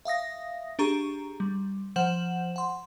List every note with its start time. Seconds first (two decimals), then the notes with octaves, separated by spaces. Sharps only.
0.05 E5 F5 D#6 A#6
0.79 D4 G4 G#4 A#5 C#6
1.40 G3
1.96 F3 C5 F#5 G6 E7 F#7
2.56 F#5 C6